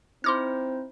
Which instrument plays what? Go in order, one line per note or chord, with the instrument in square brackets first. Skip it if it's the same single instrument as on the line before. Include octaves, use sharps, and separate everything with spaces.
[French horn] C4 [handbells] D#4 E4 C5 [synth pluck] C6 D6 F6